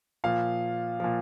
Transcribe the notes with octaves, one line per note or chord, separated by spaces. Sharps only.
A#2 F3 F5
A#2 F3